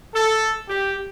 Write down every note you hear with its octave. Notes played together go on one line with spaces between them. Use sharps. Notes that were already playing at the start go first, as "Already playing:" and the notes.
A4
G4